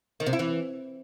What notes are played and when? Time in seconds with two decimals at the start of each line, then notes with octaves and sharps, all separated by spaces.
0.20 D#3
0.26 C3
0.33 E4
0.39 E3